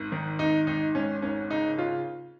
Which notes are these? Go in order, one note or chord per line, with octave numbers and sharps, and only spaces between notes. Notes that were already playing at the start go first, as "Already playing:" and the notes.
Already playing: G#1
D#3
G#1 D#4
G#1 D#4
G#2 C#4
G#1 C#4
C#3 D#4
C#3 F4